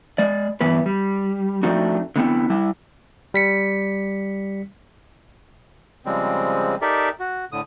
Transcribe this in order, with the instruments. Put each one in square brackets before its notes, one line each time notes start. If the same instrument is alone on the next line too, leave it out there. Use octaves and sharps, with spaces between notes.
[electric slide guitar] G#3 D5
G2 E3 B3 B4
G3
F3 A3 C4 D4 D#4 F#4
D3 B3 C4 E4
G3 E4
[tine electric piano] G3 B6 C#7
[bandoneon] C#3 F3 G3 G#3 C4
D#4 G4 A4 A#4 D5 E5
F#4
A2 D3 D#6